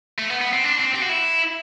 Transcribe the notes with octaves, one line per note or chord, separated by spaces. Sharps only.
A3
B3
B3
C4
D4
C4
G4
F#4
E4